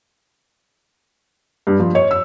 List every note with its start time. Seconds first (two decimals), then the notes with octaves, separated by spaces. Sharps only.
1.67 G2
1.80 F3
1.95 C#5
2.11 E6